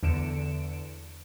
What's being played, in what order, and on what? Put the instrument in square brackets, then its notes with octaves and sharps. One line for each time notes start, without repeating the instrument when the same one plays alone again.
[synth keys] E2 D3 C#7 D7 E7